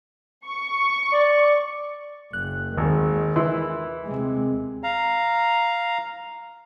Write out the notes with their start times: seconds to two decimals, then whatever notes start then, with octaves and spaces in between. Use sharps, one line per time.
0.47 C#6
1.12 D5
2.33 F#1 F#6
2.77 G#1 D#2 D#3 G#3
3.36 E3 E4 C6
4.04 C3 G#3
4.83 F5 A#5